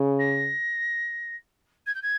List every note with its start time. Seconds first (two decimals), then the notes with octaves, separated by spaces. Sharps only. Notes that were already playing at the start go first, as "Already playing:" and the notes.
Already playing: C#3
0.19 A#6
1.86 G#6
1.95 G6
2.02 G#6